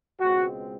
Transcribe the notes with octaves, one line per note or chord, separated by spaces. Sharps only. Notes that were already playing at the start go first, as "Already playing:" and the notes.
C#2 B2 G#3 C4 F#4